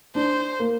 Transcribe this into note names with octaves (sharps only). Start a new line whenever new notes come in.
D4 C5
A#3